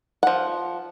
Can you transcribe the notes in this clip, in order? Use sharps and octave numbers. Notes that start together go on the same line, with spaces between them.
F3 F#5